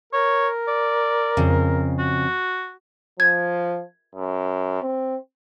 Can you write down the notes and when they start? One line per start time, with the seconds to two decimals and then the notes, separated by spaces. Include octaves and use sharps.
0.13 A#4 C#5
0.68 D5
1.37 F2 C#3
1.99 F#4
3.20 F3 G#6
4.15 F#2
4.82 C4